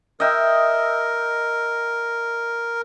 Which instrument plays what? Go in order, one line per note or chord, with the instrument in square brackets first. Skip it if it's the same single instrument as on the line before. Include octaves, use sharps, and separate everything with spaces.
[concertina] A#4 [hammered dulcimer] D#5 E5 G5